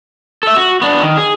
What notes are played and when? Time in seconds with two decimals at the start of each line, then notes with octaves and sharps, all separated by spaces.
0.43 A4 E5
0.56 F#4
0.82 B3 D4
1.02 D#3
1.17 G#4